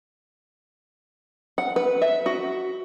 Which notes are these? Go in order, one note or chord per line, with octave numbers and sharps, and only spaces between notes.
F#5
B4
E5
F#4